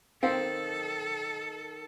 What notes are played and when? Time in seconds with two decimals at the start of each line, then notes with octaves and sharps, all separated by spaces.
0.23 D#3 C4 A4 F5